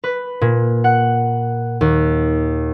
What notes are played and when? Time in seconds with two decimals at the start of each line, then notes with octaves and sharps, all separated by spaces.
0.04 B4
0.41 A#2
0.84 F#5
1.81 D#2